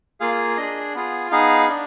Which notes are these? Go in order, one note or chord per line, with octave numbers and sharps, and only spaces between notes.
A#3 F4 G#4 F5
D4 G#4 D#5
B3 F4 G#4
B3 D#4 G#4 F5
D4